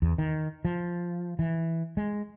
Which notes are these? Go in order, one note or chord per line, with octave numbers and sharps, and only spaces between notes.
E2
D#3
F3
E3
G#3